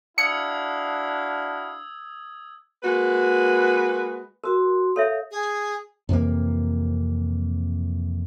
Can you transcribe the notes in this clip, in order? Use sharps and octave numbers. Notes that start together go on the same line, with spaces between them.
D4 E4 F#4 F5 D#6 E6 G#6 C#7
G#3 A#3 F#4 B4
F#4 A#4 C6
A4 C#5 E5 F5
G#4
F2 C3 E3 A#3